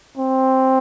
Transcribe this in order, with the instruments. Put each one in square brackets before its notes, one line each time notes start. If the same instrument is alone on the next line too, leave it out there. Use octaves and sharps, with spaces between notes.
[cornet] C4